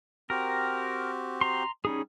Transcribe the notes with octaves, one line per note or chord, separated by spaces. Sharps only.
C4 F#4 G4 A#4
A#5 C6
G3 C#4 D#4 G#4